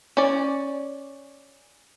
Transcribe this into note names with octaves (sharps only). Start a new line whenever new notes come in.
C#4 D5